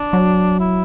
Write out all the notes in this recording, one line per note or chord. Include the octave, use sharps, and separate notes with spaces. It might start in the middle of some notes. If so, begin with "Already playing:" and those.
Already playing: D4
F#3
E4